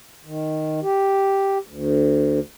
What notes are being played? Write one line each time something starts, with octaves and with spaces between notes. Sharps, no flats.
D#3
G4
D2